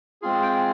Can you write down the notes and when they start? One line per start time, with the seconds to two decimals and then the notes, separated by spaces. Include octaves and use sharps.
0.22 G#3 C4 F4 G#4
0.42 G5